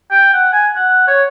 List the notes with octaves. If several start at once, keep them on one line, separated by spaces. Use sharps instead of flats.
G5
F#5
G#5
F#5
C#5